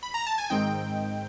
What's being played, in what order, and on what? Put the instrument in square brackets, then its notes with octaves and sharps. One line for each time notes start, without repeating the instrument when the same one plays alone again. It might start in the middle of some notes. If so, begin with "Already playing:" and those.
[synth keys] B5
A#5
A5
G#5
G#2 D#3 G#3 C4 D#4 G5